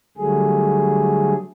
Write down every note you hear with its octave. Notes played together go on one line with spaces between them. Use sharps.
D3 F#3 G3 A3 G#4